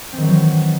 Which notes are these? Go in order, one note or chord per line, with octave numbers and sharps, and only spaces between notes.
D#3 E3 F#3 C4